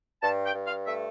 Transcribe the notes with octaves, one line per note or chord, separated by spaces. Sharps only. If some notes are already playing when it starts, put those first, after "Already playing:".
G2 A5
G5
G2
F5
A3 E5